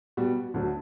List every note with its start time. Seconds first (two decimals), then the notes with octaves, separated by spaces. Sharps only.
0.17 B2 G3 B3 F#4
0.54 D2 D3 F#3